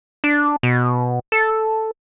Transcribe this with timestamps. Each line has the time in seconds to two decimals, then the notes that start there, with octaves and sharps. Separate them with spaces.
0.24 D4
0.63 B2
1.32 A4